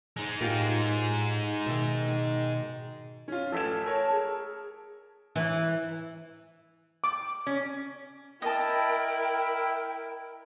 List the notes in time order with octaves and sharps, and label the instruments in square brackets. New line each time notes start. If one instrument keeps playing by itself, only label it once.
[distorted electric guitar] G#3 D#4
[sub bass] A2 [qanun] F4 G4 A#4
[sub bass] B2 [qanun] D#3 E5
[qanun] D#3
[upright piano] C#4 F4
[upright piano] A1 B6 E7 [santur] A4 G#5
[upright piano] A#4 C#5 [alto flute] A5
[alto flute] G#4
[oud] E3
[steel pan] D6
[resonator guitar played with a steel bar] C#4
[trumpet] E4 [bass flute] A#4 [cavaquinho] D#5 A5 [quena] G5